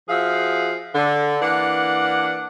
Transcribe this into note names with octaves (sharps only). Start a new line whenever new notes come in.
F3 F#4 G#4 E5 F5
D3
E3 A#3 D4 F#5